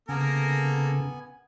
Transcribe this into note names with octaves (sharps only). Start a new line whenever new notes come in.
C#3 A#3 B3 A4 A#4 G#5